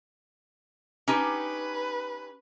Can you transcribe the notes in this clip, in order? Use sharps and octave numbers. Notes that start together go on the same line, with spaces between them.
C#4 D#4 G4 B4